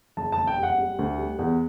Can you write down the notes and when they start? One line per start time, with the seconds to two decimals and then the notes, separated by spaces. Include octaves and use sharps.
0.17 F#1 A5
0.32 F#1 A5
0.47 G5
0.58 G3 F#5
0.78 G3
0.99 D2
1.18 G3
1.39 E2